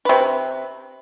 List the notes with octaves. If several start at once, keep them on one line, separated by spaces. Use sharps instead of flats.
C3 B4